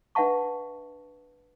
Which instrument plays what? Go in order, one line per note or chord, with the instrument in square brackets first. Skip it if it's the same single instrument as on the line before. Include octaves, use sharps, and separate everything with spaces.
[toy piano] D4 B4 E5 F#5 A5 C#6